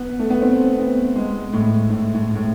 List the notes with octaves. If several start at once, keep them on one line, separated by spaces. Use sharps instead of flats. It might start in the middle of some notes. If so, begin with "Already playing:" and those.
Already playing: B3
A3
B3
C4
B3
G#3
A2
A2
A2
A2